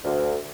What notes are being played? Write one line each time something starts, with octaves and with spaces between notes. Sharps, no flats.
D2